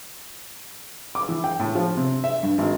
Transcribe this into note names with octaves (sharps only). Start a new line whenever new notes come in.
D6
E3
G5
A2
F3
C3
E5
G2
G#1